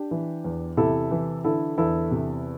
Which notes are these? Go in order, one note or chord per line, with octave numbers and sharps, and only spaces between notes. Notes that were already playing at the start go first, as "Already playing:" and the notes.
Already playing: D4 G4
E3
E2
C3 E4 A4
E3
D3 E4 A4
E2 E4 A4
C3